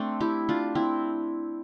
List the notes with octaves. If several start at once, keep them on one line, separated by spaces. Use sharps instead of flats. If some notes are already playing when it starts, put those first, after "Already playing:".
Already playing: A3 C4 D4
E4 G4
D4 F4
C4 E4